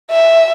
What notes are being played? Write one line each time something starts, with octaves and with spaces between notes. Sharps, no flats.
E5